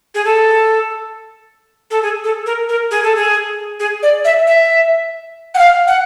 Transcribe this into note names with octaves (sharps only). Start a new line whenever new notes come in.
G#4
A4
A4
G#4
A4
A#4
A#4
G#4
A4
G#4
G#4
D5
E5
E5
F#5
F5
F#5